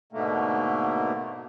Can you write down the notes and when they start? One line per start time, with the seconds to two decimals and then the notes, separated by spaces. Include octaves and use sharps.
0.13 G#2 B2 D3 A3 A#3